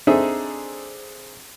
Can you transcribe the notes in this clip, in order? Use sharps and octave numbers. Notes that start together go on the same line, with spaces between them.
C4 D4 D#4 G#4 A4 E5